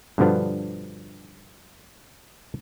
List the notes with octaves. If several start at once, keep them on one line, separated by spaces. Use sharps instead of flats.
G2 B2 D3 F3 B3 D4